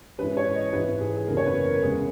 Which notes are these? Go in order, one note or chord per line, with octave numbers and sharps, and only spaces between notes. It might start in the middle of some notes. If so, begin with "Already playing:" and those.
G#2 E3 G#3 C#4 B4
C#5
D#5
G#1 G#2 E3 B4
G#4
G#4
F#1 E2 C#3 A#4
C#5
B4
A#4
E2 C#3 G#3 G#4